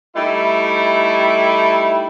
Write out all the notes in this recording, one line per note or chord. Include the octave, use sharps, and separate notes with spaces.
G3 A3 D#4 E4